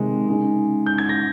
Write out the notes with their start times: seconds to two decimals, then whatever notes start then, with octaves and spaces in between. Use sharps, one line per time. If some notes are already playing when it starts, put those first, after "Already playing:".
Already playing: C3 D#3 G#3 D#4
0.27 C#3 G#3 D#4
0.86 G6
0.98 G#6
1.09 A#6